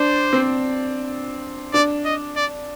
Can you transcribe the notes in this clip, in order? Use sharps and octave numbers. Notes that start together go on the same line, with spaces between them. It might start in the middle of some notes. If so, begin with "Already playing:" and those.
Already playing: D4 C5
C4
D4 D5
D#5
D5